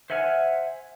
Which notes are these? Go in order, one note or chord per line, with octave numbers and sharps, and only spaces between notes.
C5 E5 F#5 G#5 F6